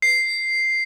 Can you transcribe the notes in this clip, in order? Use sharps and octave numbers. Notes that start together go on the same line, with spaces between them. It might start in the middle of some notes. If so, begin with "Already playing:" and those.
C7